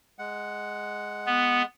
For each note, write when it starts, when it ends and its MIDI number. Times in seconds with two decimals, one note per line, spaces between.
0.19 1.65 56
0.19 1.65 78
1.26 1.62 59